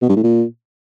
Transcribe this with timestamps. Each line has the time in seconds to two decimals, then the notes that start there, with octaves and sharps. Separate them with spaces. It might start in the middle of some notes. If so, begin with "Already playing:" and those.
0.02 B2
0.09 G2
0.16 A2
0.23 A#2